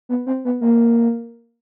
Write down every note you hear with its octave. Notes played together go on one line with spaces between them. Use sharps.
B3
C4
B3
A#3